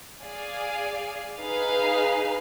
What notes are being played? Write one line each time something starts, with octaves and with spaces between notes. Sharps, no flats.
G#4 D5 F5 G#5
D#4 G#4 B4 F5